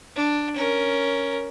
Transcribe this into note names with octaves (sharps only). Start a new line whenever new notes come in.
D4
C#4 A#4